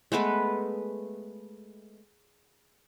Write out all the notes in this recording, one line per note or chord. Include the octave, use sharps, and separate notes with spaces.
G#3 A3 B3 B4